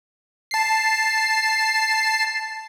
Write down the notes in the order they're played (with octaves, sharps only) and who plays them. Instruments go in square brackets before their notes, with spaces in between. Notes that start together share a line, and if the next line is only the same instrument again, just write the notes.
[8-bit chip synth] A5 C7